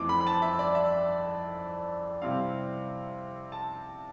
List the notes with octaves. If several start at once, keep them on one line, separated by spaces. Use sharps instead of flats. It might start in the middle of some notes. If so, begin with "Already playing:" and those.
Already playing: F2 E3 A3 C4 D6
B5
B5
A5
E5
D5
E5
C3 G3 C4 E4 F5
A5